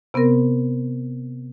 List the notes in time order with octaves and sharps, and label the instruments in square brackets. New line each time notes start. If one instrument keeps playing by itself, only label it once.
[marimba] C3 B3 C4 A#4 A#6